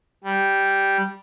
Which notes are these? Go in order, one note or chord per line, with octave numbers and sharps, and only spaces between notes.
G3